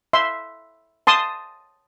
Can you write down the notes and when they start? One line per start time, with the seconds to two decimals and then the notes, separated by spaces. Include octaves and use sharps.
0.13 E5 C6
1.07 A5 C6 D#6